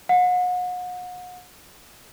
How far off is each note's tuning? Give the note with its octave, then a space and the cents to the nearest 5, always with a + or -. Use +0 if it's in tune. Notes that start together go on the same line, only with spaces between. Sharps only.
F#5 -40